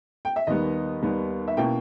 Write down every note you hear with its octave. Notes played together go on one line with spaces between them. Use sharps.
G5
E5
D#2 D#3 G3 B3 D#4 D#5
D#2 D#3 G3 B3 D#4
E5
B2 A#3 C#4 E4 G5